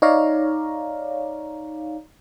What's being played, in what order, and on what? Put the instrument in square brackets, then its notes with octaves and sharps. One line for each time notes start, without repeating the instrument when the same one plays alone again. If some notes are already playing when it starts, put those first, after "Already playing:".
[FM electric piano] D#4 C#5 D5 F5 A#5